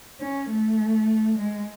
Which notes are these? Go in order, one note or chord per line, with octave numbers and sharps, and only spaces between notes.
C#4
A3
G#3